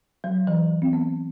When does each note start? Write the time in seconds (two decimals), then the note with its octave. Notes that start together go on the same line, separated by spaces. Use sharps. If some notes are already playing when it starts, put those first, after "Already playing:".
0.24 F#3
0.47 E3
0.82 C4
0.93 B3